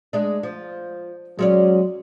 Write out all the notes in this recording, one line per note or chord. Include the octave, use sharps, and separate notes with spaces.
G#3 D4
F3
F#3 G#3 C#4 D5